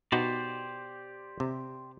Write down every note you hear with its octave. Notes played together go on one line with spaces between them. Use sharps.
B2 D#4 F#4 G4 C5 D5
C3